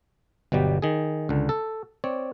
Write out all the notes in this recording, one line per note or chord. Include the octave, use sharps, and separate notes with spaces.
G1 B2 F#3 G3 G4
D#3 G#4
C#2 D3
A4
C4 C#5 D5